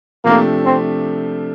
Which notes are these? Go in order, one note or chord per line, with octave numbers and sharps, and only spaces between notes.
C3 F3 A3 A#3 D4 G4
C4